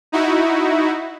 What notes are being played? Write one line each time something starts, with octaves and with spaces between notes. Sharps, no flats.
D#4 E4 F#4